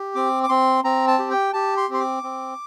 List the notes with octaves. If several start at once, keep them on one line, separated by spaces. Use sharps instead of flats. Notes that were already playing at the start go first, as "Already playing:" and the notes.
Already playing: G4
C4 D6
D6
C4 C6
C4 A#5
A5
G4
G5
G4 A5
C6
C4
C6
D6
C4